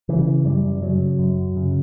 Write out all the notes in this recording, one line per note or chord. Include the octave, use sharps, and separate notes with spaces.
C#3 E3
F#2 G3
C#3 F#3
F#2
C#3